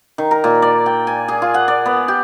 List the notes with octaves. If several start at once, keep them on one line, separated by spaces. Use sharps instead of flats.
D#3
A#4
A#2
D5
G5
G#5
G#4
F4
F#5
D5
B3
G4